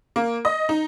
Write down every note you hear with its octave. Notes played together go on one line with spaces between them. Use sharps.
A#3
D#5
D#4